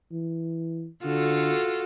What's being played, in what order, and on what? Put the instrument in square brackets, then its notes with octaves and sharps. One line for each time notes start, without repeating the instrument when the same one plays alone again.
[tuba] E3
[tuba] D3 [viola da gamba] F4 F#4 A4